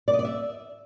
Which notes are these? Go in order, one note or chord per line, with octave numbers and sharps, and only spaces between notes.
D5
D#5
D5
E5